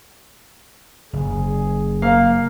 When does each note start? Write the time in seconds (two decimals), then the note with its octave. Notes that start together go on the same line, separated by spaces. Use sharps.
1.13 F#1 G#4
2.02 A#3 F5